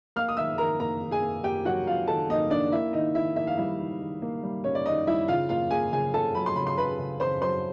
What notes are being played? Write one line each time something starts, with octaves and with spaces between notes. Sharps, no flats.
A#3 F5 F6
D#6
D#3 E5 E6
D#3 A#4 A#5
A#3 A#4 A#5
D#3
G#4 G#5
A#3
A#3 G4 G5
F#3 F#4 F#5
F#3 F4 F5
D#3 A4 A5
A#3 D#4 D#5
A#3 D4 D5
A#3 E4 E5
D#3 D#4 D#5
D#3 E4 E5
A#3 E5
F5
G3 E4 E5
D#3
D#3
A#3
G3
G3 C#4 C#5
D5
D#3 D#4 D#5
G3 E4 E5
C#3 F4 F5
A#3 F4 F5
A#3 G#4 G#5
C#3 G#4 G#5
C#3 A4 A5
F#3 B5
C6
C#3 B5
C6
C#3 B4 B5
C#3
C#3 C5 C6
F#3 C5 C6